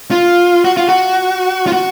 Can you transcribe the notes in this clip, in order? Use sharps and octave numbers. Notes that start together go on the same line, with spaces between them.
F4
F#4
F4
F#4
F4
F#4